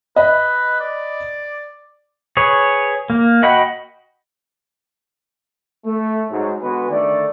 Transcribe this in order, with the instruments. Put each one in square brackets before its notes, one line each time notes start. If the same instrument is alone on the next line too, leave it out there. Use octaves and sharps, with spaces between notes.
[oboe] B4 [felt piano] D#5 B5
[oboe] D5
[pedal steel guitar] G#4 B4 C#5
A#3
F#4 D#5 F#5 G5 B5
[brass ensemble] A3
G#2 F#3
D3 G#3 B3 F#4 G#4 B4
D3 D#3 A3 D5